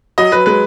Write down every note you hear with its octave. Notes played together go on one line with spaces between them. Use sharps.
F#3 D#5
F#3 B4
G#3 B4